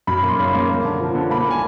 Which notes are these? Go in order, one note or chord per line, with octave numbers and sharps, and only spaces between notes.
F#2 B5
A#3
C6
C#3 B5
A#3
A#3
D3
F3
D3
A#3 B5
A#3 G#5